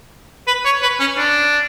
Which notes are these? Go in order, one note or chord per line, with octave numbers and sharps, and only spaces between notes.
B4
C#5
B4
C#4
D4